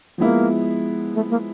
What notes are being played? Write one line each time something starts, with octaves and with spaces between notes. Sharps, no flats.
F3 G#3 A#3 B3 E4
A3
A#3